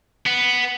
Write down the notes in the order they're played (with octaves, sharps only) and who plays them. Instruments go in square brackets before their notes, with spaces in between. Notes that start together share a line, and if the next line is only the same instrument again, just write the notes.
[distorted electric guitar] B3